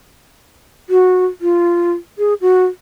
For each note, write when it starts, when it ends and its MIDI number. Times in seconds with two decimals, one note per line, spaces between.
0.90 1.25 66
1.41 1.92 65
2.18 2.34 68
2.41 2.65 66